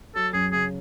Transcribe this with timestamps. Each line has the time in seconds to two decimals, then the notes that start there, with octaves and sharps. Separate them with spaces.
0.15 F#3 A4
0.33 F#2 G#4
0.52 C#3 G#4